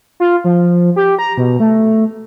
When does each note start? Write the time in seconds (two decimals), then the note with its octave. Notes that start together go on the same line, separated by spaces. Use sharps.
0.20 F4
0.44 F3
0.96 G4
1.19 A#5
1.37 B2
1.60 A3